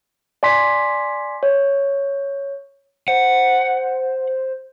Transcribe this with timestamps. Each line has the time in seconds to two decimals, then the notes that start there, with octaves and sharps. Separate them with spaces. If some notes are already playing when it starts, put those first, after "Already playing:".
0.43 D5 G#5 C6 B6
1.43 C#5
3.08 C5 F#5